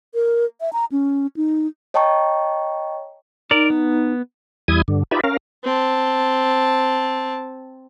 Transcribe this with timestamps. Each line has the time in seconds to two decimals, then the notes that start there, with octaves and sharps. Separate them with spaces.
0.14 A#4
0.61 E5
0.73 A#5
0.92 C#4
1.37 D#4
1.94 C#5 D#5 G5 A5 A#5 C#6
3.51 D#4 A#4 D5
3.70 B3
4.68 E2 G3 E4 G#5 D#6
4.88 G2 D3
5.11 D#4 F4 G4 B4 D5 E5
5.24 C#4 A#4 F5
5.64 C4 A5